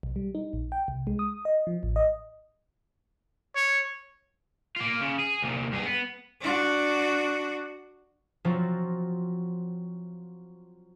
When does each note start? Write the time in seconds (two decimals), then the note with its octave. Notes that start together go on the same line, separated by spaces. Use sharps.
0.03 B1
0.16 G3
0.35 D#4
0.53 A#1
0.72 G5
0.88 C2
1.07 G#3
1.19 D#6
1.45 D#5
1.67 F3
1.83 A1
1.96 D#5
3.55 C#5
4.76 A#3 F4
5.01 C#3
5.19 G#4
5.42 C2 A#2
5.71 G2 G#4
5.86 B3
6.41 D4 F#4
8.45 F3 F#3 C4 F4 F#4